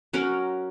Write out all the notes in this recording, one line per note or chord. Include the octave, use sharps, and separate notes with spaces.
F#3 C#4 F#4 A#4